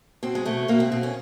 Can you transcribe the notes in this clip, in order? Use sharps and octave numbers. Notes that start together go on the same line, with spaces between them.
B2 C4
G#3
B2 A3
B2 A#3
C4
B2 C4
C#4